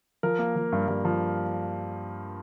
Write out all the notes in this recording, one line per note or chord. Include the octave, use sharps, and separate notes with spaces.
F3 A#4
A#3
F3
G2
G2
F3